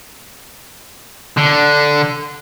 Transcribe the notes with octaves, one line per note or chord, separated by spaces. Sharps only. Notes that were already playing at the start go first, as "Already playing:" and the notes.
D3